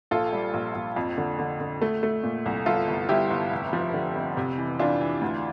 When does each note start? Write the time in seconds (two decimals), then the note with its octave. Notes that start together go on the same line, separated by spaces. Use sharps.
0.11 A#1 F4 A4
0.33 G3
0.54 A#1
0.75 A#1
0.96 F2
1.18 D3
1.39 D3
1.61 D3
1.82 A3
2.03 A3
2.23 A#2
2.46 C2
2.66 G1 F4 A4
2.88 G1
3.09 G1 E4 G4
3.30 G1
3.52 F1
3.73 F3
3.94 D3
4.15 F2
4.37 C3
4.58 E3
4.79 E3 D4 F4
5.01 E3
5.21 D2